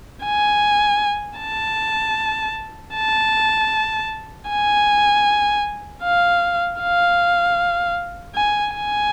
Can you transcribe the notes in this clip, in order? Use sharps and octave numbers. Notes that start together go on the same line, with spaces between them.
G#5
A5
A5
G#5
F5
F5
G#5
G#5